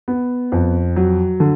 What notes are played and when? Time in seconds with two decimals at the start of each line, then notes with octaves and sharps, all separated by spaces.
0.08 B3
0.52 F2
0.96 F#3
1.40 D3